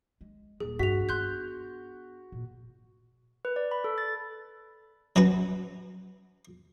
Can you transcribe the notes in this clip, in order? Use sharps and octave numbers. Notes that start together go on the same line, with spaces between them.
G#3
D#1 G#4
G2 F#4 B6 F7
B3 D4 C6 F#6 G6
A#2
B4
D5
B5
A4
A6
F#3 C#4 B4